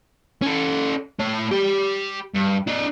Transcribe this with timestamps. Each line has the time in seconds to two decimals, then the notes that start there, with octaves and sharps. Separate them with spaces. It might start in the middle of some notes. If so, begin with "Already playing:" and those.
0.42 C#4 A4
1.19 A3 C#5
1.51 G4 B5
2.34 G2
2.67 D4 D#5